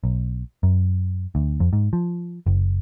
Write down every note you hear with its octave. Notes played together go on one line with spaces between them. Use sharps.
B1
F#2
D2
F2
G#2
F3
F#1